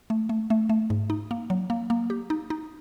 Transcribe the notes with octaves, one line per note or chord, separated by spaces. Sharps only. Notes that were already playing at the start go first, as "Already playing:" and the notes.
A3
A3
A3
A3
G#2
D#4
A#3
F#3
A#3
A#3
G4
D#4
D#4